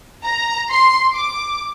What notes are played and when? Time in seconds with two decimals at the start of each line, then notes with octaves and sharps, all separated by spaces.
0.25 A#5
0.71 C6
1.14 D6